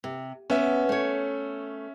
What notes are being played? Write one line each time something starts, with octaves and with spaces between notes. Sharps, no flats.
C3
B3 C#4 E5
A3 C#5